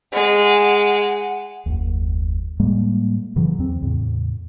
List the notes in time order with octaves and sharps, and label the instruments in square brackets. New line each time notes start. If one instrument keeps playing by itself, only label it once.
[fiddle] G#3 [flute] F#5
[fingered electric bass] F#1 D#2
A2 G3 G#3 A#3
F#2 C#3 E3 F#3
E2 C4
E2 A2 C#3